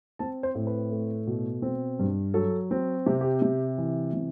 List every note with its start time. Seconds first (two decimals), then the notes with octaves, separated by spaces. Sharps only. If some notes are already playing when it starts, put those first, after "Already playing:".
0.19 C4 A5
0.43 C5
0.55 A2
0.67 B4
0.91 A3
1.27 B2
1.62 C4
1.99 G2
2.34 F#3 A4
2.71 C4
3.06 C3 G4
3.21 G4
3.42 C3
3.78 E3
4.13 C3